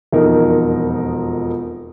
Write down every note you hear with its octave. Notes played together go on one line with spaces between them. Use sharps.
E1 F2 D#4 A#4